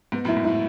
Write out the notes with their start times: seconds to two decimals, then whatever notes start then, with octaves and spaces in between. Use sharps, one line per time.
0.12 G#2 B3
0.25 F#2 A2
0.28 E4
0.37 G#2
0.45 A2 E4